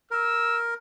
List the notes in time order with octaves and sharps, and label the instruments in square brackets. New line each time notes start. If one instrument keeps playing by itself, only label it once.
[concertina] A#4 [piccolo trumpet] E6